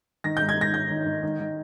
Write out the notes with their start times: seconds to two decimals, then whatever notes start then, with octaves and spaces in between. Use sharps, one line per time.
0.24 D#3 A#6
0.37 G#2 G6
0.49 G#6
0.58 G#2 A#6
0.73 G#2 G6
0.90 D#3
1.06 D#3
1.23 D#3
1.40 D#3